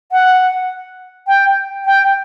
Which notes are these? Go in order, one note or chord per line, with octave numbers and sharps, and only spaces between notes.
F#5
G5
G5